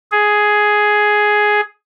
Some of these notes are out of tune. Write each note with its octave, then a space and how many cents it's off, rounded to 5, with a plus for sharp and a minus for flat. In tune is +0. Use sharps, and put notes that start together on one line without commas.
G#4 +10